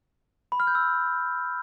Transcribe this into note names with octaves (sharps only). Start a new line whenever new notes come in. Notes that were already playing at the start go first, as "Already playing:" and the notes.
B5
F6
G6
E6